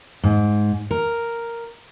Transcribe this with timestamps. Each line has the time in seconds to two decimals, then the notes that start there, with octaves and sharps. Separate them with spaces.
0.24 G#2
0.91 A#4